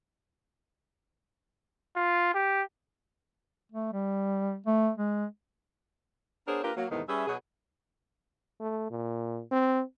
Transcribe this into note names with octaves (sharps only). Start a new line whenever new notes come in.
F4
G4
A3
G3
A3
G#3
B3 D4 G#4 A#4 C5 C#5
A#3 D4 F4 G4 A#4 B4
F#3 A#3
E2 A2 C3 D#3 G#3 B3
G3 C#4 G#4 B4 E5
B2 F#3 G#4
A3
A#2
C4